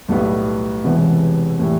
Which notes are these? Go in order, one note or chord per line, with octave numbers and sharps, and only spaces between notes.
B1 A2 G3 B3
E1 E2 C3 E3 B3
A2 E3 G3